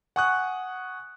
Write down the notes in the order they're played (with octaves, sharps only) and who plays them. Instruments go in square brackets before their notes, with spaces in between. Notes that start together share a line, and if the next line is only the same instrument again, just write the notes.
[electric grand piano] F#5 G#5 C#6 D#6 F#6